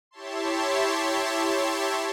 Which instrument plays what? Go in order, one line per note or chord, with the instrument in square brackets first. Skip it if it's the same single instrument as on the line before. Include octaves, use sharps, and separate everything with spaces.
[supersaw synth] E4 G4 C#5 E5 A5 C6